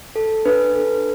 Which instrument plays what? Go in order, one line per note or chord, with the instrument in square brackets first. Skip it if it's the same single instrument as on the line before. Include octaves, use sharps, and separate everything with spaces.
[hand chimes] A4
D4 B4
A4